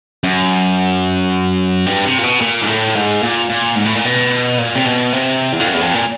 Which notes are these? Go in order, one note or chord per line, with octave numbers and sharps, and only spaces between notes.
F#2
G2
C3
A#2
B2
A#2
G#2
A2
G#2
A#2
A#2
G#2
A2
A#2
B2
A#2
C3
B2
C3
E2
F2
F#2
E2
F2
A#2